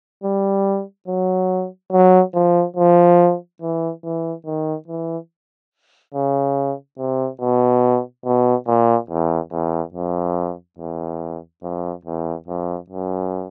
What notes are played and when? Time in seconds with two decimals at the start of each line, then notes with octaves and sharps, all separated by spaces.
0.24 G3
1.08 F#3
1.92 F#3
2.35 F3
2.76 F3
3.62 E3
4.04 E3
4.46 D#3
4.88 E3
6.14 C#3
6.99 C3
7.41 B2
8.26 B2
8.67 A#2
9.10 E2
9.52 E2
9.94 F2
10.79 E2
11.63 F2
12.05 E2
12.48 F2
12.90 F#2